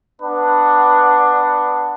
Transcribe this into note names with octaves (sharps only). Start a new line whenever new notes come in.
B3 D4 B4 F#5